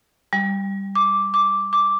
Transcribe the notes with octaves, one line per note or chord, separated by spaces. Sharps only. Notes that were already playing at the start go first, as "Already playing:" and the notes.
G3
D6
D6
D6